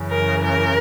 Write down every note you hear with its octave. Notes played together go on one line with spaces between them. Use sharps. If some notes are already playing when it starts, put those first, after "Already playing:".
Already playing: F#2 C#3 E3
A#4
A#4